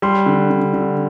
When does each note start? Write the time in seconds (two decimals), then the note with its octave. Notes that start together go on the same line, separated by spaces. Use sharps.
0.02 G3 C6
0.26 D3
0.50 D3
0.74 D3